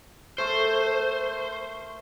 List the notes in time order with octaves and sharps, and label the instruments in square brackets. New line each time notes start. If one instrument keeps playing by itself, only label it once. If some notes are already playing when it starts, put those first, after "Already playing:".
[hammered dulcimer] A3 A#4 C#6 [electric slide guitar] C5